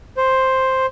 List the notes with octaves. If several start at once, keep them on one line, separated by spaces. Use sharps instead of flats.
C5